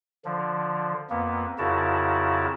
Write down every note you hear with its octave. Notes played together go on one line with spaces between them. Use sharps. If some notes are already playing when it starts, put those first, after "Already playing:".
D3 F3
F2 A#3 B3
F2 C#3 E4 F#4 A#4 A5